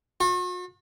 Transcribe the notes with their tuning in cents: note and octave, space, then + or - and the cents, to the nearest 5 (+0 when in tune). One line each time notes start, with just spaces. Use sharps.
F#4 -45